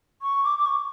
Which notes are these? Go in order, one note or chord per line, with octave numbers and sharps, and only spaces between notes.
C#6
D6
D6
C#6